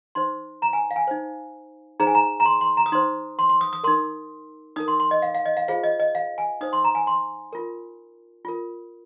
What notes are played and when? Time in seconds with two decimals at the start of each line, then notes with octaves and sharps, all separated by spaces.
0.15 D#4 C5 C6
0.62 A#5
0.73 G#5
0.91 F5
0.96 G#5
1.07 D#4 C5
2.00 D#4 G#4 C5 A#5
2.07 G#5
2.15 A#5
2.40 A#5
2.45 C6
2.61 C6
2.77 A#5
2.86 D#6
2.92 D#4 C5 C6
3.39 C6
3.49 C6
3.61 D#6
3.73 D#6
3.84 D#4 A#4 C6
4.76 D#4 A#4 D#6
4.88 C6
5.00 C6
5.11 D#5
5.22 F5
5.35 F5
5.45 D#5
5.57 F5
5.68 F4 G#4 C5 F5
5.84 D#5
5.99 D#5
6.15 F5
6.38 G#5
6.61 D#4 C5 D#6
6.73 C6
6.84 A#5
6.95 G#5
7.07 C6
7.53 F4 A#4
8.45 F4 A#4